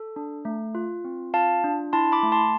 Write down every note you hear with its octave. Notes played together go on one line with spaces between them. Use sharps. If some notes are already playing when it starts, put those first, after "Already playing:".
Already playing: A4
D4
A3
F4
C4
F4 F5 A5
D4
E4 A5 C6
B5 D6
A3
A5 C6